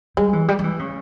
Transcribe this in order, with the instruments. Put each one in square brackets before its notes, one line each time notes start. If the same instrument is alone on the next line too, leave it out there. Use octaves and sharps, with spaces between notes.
[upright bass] G3 [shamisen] G#3
[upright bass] E3
G3
G3
E3
C#3